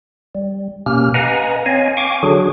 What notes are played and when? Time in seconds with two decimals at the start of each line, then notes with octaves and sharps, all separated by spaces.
0.35 G3
0.86 B2 A#3 C#4 G4 F6
1.14 B4 D#5 F5 F#5 G#5 A#5
1.66 C4 C#5 D#5 F5 G#5
1.97 F5 G5 G#5 C#6 D6
2.23 D3 F#3 D4 F#4 G#4